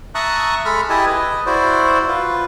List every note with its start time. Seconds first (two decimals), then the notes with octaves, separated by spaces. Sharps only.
0.15 E5 A5 A#5 C#6 D#6 F#6
0.65 G#3 A4 B5 F6
0.90 E4 G4 G#4 D#5 G#5 A5
1.06 B4 D#5
1.46 E4 F#4 C5 D5
2.08 F4 B4